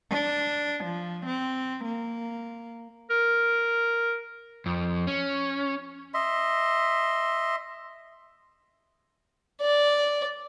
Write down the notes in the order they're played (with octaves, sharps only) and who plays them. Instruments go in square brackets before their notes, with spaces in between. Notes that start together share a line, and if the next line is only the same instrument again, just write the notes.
[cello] D4
F3
C4
A#3
[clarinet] A#4
[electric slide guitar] F2
C#4
[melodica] D#5 E5 C6
[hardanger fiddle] D5